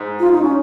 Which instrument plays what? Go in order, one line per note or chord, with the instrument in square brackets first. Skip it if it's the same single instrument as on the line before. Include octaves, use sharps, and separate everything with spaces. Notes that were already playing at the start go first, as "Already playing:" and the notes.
Already playing: [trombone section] G#2
[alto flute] F4
D#4
C#4